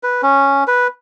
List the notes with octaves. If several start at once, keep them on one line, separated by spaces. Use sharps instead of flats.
B4
C#4
B4